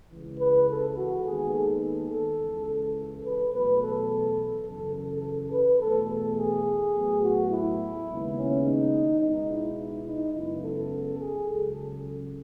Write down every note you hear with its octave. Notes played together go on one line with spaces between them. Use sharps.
C#2 C#3 E3
B4
A4
F#4
D#2 D#3 G#3 B3 G#4
A4
A4
A4
C#2 C#3 E3
A4
B4
E2 B2 F#3 A3 B4
A4
F#2 C#3 E3 A4
A4
A4
B4
E2 B2 A3 A4
A4
G#4
A2 F#3 B3
F#4
E4
D#2 C#3 G#3 B3
C#4
D#4
B2 G#3 B3 D#4
E4
D#4
F#2 C#3 G#3 B3 E4
A4
G#4
C#2 C#3 F#3 A4